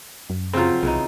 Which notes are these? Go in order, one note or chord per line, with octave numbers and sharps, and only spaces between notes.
F#2
C#3 F3 F#3 C4 F4
C2 C#3 E3 D#4